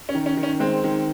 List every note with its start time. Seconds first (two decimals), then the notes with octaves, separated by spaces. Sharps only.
0.09 C#4
0.14 D#3
0.26 C#4
0.37 D#3
0.43 C#4
0.60 G#3 C4
0.84 D#3